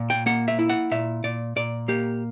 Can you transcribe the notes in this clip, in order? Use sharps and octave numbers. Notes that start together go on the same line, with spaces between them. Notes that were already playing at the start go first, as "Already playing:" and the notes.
Already playing: A#2
G5
A#3 F#5
E5
E4
F#5
A#2 E5
A#2 D5
A#2 D5
A#3 G4